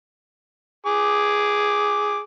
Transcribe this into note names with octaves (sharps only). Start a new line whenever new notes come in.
G#4 D6